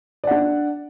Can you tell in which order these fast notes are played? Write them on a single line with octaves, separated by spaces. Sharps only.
D5 F#5 D4